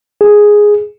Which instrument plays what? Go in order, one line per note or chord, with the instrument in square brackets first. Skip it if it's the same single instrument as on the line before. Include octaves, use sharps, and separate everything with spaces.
[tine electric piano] G#4